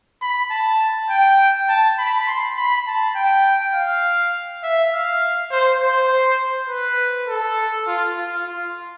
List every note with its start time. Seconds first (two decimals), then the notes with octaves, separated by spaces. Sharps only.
0.22 B5
0.51 A5
1.10 G5
1.69 A5
1.98 B5
2.27 C6
2.57 B5
2.87 A5
3.16 G5
3.75 F5
4.64 E5
4.93 F5
5.52 C5
5.81 C5
6.69 B4
7.29 A4
7.87 F4
8.16 F4
8.46 F4